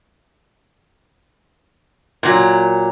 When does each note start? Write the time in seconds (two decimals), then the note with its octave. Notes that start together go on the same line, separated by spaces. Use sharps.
2.23 A#2 F#3